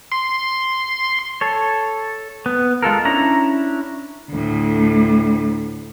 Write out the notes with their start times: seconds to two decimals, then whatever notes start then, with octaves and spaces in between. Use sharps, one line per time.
0.12 C6
1.41 A4 C#5
2.46 B3
2.82 G#3 F4 A4 A#4
3.05 C#4 D4 E4 A#5
4.30 D2 A2